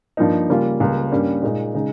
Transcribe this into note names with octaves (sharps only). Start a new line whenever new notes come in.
G2 F3 A#3 D#4
C#3 G3 A#3 C#4 F4
C#2 C#3 G3 A#3
G2 G3 A#3 C#4
A#2 G#3 D#4
C#3 G#3 D#4